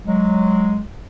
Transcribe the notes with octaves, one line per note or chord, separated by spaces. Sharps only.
F#3 G#3